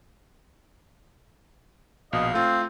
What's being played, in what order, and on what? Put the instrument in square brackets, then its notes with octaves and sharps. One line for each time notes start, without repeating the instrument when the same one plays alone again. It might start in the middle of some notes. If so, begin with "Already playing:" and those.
[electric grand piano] A#1 B2 [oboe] D#5 [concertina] F5
[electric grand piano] A3 F4 [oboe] C4